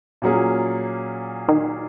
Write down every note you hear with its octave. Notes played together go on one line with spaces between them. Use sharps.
A#2 F#3 A#3 C#4 G#4
D#3